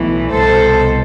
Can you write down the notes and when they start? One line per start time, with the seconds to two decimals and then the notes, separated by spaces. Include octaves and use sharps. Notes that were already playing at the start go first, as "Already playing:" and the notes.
Already playing: B1 A2 E3
0.31 C2 B2 A4 C5